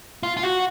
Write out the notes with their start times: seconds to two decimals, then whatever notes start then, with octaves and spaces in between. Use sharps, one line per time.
0.23 F4
0.37 F4
0.43 F#4